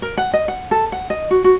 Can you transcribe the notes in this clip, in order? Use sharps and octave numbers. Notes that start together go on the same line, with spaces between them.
A#4
F#5
D#5
F#5
A4
F#5
D#5
F#4
F#4